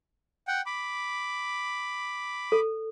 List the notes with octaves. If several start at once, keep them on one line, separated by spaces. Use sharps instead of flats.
F#5 G5
B5 D6
A4